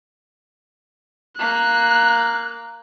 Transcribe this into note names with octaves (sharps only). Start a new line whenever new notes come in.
A#3 F#6